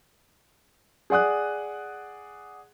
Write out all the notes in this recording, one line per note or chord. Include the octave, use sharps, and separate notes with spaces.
G#4 D5 F#5 D#6 F#6